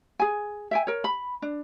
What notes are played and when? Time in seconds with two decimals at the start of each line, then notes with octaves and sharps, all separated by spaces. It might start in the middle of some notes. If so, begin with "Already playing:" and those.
0.19 G#4 G#5
0.71 E5 G5 G#5
0.87 A#4 C#5
1.04 B5
1.42 D4